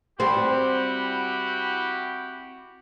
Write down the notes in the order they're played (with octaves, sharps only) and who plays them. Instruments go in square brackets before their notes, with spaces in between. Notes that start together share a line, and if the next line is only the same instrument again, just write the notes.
[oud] G3 C4 [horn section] E4 F#4 G4